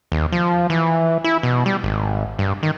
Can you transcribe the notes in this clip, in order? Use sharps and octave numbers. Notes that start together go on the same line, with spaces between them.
D#2
F3
E3
E4
B2
G3
G#1
G2
D#3